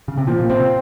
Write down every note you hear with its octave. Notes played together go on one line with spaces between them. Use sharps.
C#3
C3
A#2 F3
A#2
C3 C4